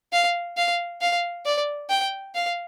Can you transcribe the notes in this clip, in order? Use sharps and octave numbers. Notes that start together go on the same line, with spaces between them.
F5
F5
F5
D5
G5
F5